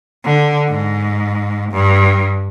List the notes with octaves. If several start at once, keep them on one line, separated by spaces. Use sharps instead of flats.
D3
G#2
G2